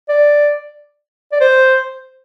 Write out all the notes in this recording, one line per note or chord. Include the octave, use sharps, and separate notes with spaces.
D5
D5
C5